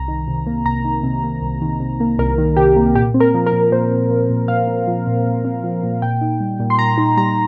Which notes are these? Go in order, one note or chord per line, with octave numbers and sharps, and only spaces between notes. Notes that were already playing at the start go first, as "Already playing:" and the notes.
Already playing: C2 A#5
D#3
C3
A#3
C2 A#5
D#3
C3
A#3
C2
D#3
C3
A#3
C2 A#4
D#3
C3 G4
A#3
A#2 G4
C4
A#4
F3
A#4
A#2
A#2 C5
C4
F3
A#2
A#2 F5
C4
F3
A#2
A#2
C4
F3
A#2
A#2 G5
D#4
G3
A#2
C6
A#2 A#5
D#4
G3 A#5